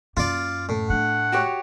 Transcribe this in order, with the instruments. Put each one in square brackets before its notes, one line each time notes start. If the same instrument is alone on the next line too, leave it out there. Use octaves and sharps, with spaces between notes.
[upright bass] F#2 A#3 [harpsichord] F4 D5
[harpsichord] A2
[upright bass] A3 D4 [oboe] F#5
[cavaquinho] F#4 G4 C#5